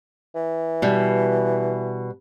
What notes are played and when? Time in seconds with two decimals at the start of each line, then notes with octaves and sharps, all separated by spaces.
0.35 E3
0.82 B2 G3